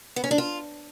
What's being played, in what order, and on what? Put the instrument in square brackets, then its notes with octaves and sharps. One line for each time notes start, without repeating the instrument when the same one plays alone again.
[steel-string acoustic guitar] B3
C#4
D4
F4